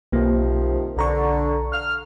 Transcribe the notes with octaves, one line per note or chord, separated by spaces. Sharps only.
B1 C3 D#3 F3 A#3
B1 D3 A#5 C#6
F6